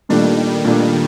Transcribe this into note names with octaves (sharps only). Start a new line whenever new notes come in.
A#2 D#3 G3 A3 D4
A#2 A3 D4